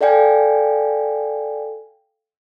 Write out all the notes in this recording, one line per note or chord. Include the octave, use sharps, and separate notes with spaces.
A4 D5 F5 G5 G#5